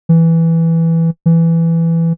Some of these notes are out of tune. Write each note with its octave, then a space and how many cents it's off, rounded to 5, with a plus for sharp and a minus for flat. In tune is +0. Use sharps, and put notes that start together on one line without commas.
E3 +0
E3 +10